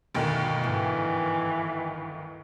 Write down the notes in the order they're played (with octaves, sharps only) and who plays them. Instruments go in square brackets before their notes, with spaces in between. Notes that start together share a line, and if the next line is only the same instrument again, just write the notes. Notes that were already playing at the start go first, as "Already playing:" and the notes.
[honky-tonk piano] G1 D2 D#3 [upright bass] B2
[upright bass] G#2 D4 [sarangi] E3